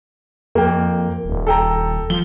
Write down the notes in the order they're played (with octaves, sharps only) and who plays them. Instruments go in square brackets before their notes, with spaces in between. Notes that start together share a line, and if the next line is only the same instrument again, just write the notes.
[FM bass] F2 [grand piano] A#3 G5
[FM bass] D#1
[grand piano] A4 G5 A#5
[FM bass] F3 [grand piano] G7